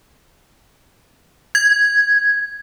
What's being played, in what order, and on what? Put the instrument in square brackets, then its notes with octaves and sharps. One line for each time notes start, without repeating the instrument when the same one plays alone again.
[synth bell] G#6